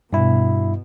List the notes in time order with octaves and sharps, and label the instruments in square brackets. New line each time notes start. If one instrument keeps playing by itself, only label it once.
[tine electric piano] G2 E4 [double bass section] B2